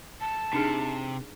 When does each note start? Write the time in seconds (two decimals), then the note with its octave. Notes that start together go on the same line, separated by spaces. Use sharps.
0.21 A5
0.53 C3 D4 D#4 G#4